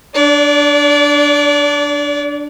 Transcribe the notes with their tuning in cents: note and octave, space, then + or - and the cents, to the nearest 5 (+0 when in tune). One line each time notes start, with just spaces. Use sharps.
D4 +0 D5 -30